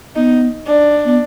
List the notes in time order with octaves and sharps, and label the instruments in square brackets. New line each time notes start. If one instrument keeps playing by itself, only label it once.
[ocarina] B3 [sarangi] D#4
[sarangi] D4
[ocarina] B3